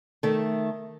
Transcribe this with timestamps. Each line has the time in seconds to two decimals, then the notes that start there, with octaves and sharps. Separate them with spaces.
0.23 D#3 A3